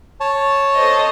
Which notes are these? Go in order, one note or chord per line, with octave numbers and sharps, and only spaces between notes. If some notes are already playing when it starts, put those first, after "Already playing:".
C#5 A5
A4 C5 D#5